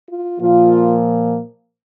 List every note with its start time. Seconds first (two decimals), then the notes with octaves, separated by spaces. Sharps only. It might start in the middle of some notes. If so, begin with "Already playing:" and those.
0.08 F4
0.39 A#2 F3 A#3 F4